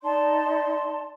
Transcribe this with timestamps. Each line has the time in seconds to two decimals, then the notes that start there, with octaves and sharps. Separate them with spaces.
0.03 D#4 D5 A5 C6